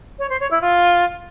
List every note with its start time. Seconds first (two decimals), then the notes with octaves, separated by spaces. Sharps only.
0.18 C#5
0.29 C5
0.40 C#5
0.50 E4
0.61 F4